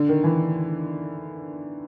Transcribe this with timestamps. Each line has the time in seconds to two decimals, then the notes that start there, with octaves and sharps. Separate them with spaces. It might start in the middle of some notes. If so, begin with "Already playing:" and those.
Already playing: D3
0.09 D#3
0.24 E3